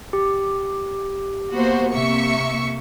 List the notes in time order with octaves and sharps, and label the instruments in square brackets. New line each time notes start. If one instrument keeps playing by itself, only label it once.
[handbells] G4
[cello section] A#3 B3 [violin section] F#4 C5
[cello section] C3 A#3 [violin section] E5 C#6 C#7